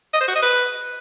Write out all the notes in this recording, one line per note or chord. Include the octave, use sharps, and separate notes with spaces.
D#5
C5
F#4
D#5
B4